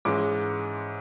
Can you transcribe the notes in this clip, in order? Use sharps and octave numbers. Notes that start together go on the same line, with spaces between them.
G#2 E3 G#3 C#4 D6